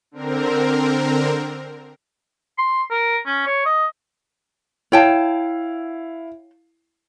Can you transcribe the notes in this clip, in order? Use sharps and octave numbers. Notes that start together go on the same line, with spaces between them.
D3 C4 A#4
C6
A#4
C#4
C#5
D#5
E4 C#5 F5 G5 A5